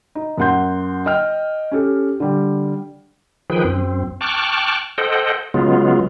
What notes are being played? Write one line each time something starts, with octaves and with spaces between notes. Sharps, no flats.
D#4
F#2 A#3 F#5 C6 G6
D#5 G5 F6
C#4 G4 A4
D3 G3
D#3 F3 G#4 B4 G5
F#2 C4
G5 A5 C#6 D6 F6 F#6
A4 C5 D#5 F#5 G5
C#3 F#3 G#3 B3 F4